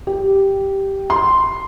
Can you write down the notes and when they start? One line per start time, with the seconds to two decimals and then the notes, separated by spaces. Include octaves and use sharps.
0.07 G4
1.10 C6